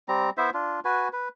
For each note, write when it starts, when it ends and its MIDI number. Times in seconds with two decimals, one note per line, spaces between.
0.09 0.30 55
0.09 0.30 60
0.09 0.30 82
0.38 0.50 59
0.38 0.50 64
0.38 0.50 72
0.38 0.50 76
0.54 0.80 62
0.54 0.80 65
0.85 1.08 66
0.85 1.08 71
0.85 1.08 80
1.13 1.29 71